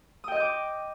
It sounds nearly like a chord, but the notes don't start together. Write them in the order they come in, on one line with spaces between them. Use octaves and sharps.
D#6 G5 D#5 G6 D6